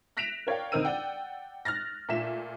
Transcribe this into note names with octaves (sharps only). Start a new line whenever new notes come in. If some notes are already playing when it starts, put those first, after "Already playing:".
F#6 A#6 B6 D7 E7 F7
A#4 C#5 D5 F5 G5
D2 C4 D#4 A#4 E6 D#7
D5 F#5 G5
F6 F#6 A6 A#6
A#2 A3 E5 B6 E7